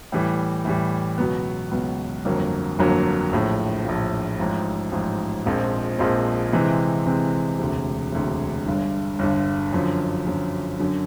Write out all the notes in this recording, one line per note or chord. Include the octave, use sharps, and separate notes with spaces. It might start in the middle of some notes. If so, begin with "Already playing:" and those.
A2 E3 G3
A2 E3 G3
C#2 B2 F#3 B3
C#2 B2 F#3 B3
G1 F2 D3 F#3 A#3
G1 F2 D3 F#3 A#3
A#1 A2 F3
A#1 A2 F3
A1 G#2 F3
A1 G#2 F3
A#1 A#2 F3 G#3 C4
A#1 A#2 F3 G#3 C4
C3 E3 G#3 C4
C3 E3 G#3 C4
E1 D2 C3
E1 D2 C3
G1 G2 D3
G1 G2 D3
F#2 D3 F3
F#2 D3 F3
F#2 D3 F#3